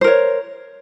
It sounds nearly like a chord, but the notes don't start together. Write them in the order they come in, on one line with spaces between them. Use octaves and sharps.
C5 A#4 C#5